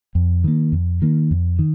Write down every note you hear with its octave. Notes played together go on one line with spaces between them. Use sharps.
F2
D#3 A#3
F2
D#3 A#3
F2
D#3